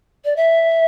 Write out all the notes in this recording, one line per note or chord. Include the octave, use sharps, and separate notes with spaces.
D5
E5